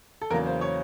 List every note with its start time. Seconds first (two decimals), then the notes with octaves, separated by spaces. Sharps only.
0.22 A4
0.30 E2 C#3 F#3 A#3 A#4
0.46 C5
0.61 C#5